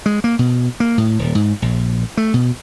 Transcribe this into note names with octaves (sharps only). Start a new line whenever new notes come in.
G#3
A#3
B2
A#3
A2
D#1
G#2
A#1
A3
B2